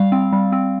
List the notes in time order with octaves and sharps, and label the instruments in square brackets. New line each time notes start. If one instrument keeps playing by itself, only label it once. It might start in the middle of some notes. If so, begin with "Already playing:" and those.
Already playing: [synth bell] G3 F5
C4
G3
C4